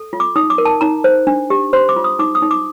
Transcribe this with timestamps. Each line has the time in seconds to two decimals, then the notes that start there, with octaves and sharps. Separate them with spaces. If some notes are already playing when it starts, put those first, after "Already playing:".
Already playing: A4
0.13 F4
0.20 D6
0.36 D#4 D#6
0.50 D6
0.58 A#4
0.65 A5
0.81 D#4 A#5
1.04 C5
1.27 D4
1.50 G4
1.73 C5 C6
1.89 D6
1.96 F4
2.04 D#6
2.19 D#4 D6
2.35 D#6
2.42 D#4
2.51 D6